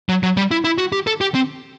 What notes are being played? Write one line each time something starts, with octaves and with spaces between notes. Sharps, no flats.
F#3
F#3
G3
E4
E4
F#4
G4
A4
G4
C4